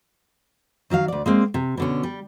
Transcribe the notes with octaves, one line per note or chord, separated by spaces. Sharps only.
D#3 F#3 E5 F5
D2 D5
G#3 A#3 C4
C3
B2 D3 C#4
G3